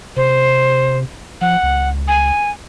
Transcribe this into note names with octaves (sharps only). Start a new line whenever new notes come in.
C3 C5
F3 F#5
C#2
G#5